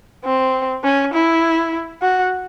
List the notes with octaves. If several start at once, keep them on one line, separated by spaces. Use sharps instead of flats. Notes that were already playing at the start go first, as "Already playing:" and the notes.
C4
C#4
E4
F#4